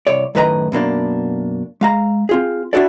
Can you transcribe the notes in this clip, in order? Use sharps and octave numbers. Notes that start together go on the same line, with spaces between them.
C2 C#5 D5
F#2 A2 D#3 B4 D#5 A#5
F#2 B2 A#3 D4
G#3 F5 A#5
C4 F4 G#4
D4 E4 F#4 A4 D5